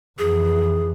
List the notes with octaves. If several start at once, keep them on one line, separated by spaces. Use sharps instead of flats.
F2 E3 G#4